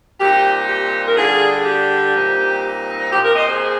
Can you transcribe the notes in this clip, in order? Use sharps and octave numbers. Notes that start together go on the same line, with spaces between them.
A#2 G3 C4 D#4 G4
G4
A#4
D3 G3 D4 F4 G#4
G4
A#2 G3 C4 D#4
A#2 F3 C4 G4
G4 A#4
C5 D#5
G#4 C5